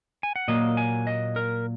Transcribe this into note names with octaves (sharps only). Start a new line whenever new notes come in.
G#5
F#5
A#2 F#3 A#3 D#5
G#5
D#5
A#4